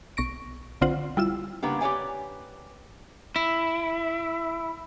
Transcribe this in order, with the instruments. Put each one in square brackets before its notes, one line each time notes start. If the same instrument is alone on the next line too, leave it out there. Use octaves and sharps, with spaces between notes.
[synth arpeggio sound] B1 C#6 A#6 D7
B1 D3 C4 F4 C5 F#5
G3 E4 F4 E6
[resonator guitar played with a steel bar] C#3 A#3 B3 D4 G4
G4 B4 C#5 D5 G#5
[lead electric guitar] E4